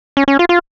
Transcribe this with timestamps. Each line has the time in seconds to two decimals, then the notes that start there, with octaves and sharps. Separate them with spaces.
0.17 C#4
0.28 C#4
0.39 F4
0.49 F4